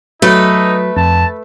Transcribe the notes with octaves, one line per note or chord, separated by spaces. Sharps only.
F#3 A3 D#4 B4
F2 A5